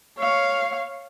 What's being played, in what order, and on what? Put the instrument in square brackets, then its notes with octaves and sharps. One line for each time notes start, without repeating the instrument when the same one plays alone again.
[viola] C#5 F5